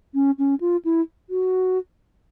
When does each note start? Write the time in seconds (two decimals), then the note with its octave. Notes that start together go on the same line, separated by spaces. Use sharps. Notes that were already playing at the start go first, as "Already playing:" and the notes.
0.15 C#4
0.39 C#4
0.61 F4
0.85 E4
1.30 F#4